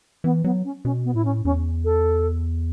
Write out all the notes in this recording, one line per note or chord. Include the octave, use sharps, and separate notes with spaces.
E3 B3
F#3 B3
C#4
B2 C#4
B3
A2 E4
C#4
E2 C#4
A4